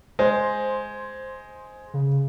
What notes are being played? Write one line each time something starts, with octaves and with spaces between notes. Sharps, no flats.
G#3 C5
C#3